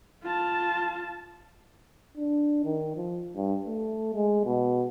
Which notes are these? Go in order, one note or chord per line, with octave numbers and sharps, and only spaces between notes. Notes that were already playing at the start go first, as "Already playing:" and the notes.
F4 A5
D4
D#3
F3
G2
A3
G#3
B2